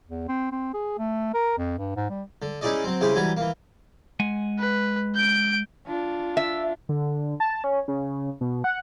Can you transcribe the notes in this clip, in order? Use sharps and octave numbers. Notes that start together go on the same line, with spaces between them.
E2
C4
C4
G#4
A3
A#4
F2
G2
G#2
G3
D3
C#4 D#4 E4 G#4 D5 D#5
F#3 C4
C#3 E4 G4 G#4 C5
E3 F#3 G3 G#5 A#5
E3 A#3
G#3 F#5 G#5
B4
G6 D7
D4 F4
E5
D3
A5
C#4
C#3
B2
F#5